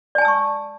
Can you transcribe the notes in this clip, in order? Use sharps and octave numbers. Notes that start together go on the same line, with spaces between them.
D5 G#5 A5 C#6 E6